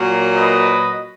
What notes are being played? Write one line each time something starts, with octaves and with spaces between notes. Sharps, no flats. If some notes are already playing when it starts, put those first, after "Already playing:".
Already playing: A#2 F#3 A#3
B4 D#5